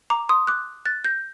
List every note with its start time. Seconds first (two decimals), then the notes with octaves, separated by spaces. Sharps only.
0.10 A#5 D6
0.29 C6 D#6
0.47 D6 F#6
0.85 F#6 A6
1.04 G6 A#6